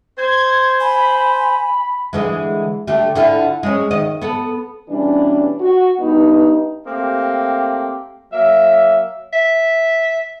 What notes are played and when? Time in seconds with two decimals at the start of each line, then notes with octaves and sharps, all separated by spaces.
0.18 C5 G#6
0.80 G#5 B5
2.13 D3 E3 G#3
2.87 D3 A3 G4
3.15 D3 E4 F4
3.63 G#3 C#4
3.91 D#3 D#5
4.22 B3 A4
4.89 B2 E3 G3 C#4 D4
5.60 F#4
6.00 G2 B3 D#4
6.85 A3 A#3 C4 G4
8.32 F#3 A#3 E5
9.33 E5